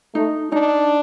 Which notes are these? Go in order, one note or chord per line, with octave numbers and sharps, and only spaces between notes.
A3 D#4
D4 D#4